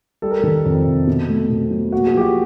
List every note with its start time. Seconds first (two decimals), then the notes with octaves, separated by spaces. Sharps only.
0.22 G3 A4
0.31 A#4
0.40 D#3 A4
0.65 F2
0.86 C3
1.07 B2
1.29 A3
1.50 B2
1.71 F#3
1.92 A#3 F#4
2.07 G#4
2.14 F3 G4
2.21 F#4